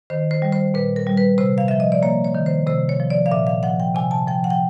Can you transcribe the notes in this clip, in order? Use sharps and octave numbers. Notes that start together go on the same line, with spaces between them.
D#3 C5
C5
G3
C5
A#2 B4
A#4
G3
B4
C3 C5
F5
F3 E5
D#5
D5
A#3 C#5
C#5
D#3
C5
C3 C5
C#5
F3
D5
F5
A#2 E5
F5
F3 F#5
G5
C3 G#5
A5
F3 G5
F#5
G5